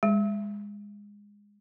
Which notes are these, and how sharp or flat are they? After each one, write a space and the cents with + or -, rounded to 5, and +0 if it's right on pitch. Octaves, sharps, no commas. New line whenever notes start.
G#3 -20